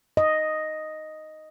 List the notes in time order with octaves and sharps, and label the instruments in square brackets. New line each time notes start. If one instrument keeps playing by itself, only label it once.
[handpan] D#5